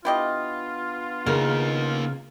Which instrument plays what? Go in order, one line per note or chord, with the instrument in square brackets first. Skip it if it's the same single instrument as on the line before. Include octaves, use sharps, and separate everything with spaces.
[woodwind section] B3 D4 F4 [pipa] E4 G4 D#5
[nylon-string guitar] C#3 [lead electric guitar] A#3 D#4 [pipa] A#4